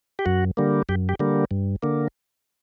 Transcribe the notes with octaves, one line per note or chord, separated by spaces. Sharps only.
G4
F#2 F#4
D3 G3 A#3
F#2 G4
G4
D3 G3 A#3
G2
D3 A#3